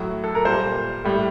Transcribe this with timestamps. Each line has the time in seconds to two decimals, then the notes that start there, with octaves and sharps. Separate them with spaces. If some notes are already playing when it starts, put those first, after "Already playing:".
Already playing: A2 F#3
0.24 A4
0.35 A#4
0.45 A#2 G3 C5
1.04 A2 G3